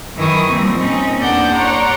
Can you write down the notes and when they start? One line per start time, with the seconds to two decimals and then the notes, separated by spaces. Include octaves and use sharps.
0.15 F#2 D#3 E3 E4 C#6 D#6
0.49 F3 G3 A#3 C4
0.78 A#2 C4 C#4 D#4
1.21 E2 A#3 D4 D5 F#5 G6
1.52 C#5 D5 F#5 A#5 C6